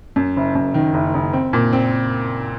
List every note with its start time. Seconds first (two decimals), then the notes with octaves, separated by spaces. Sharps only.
0.16 F#2
0.37 F#1
0.55 F#2
0.74 D#3
0.94 F#1
1.14 F#1
1.33 C4
1.53 A#2
1.73 C4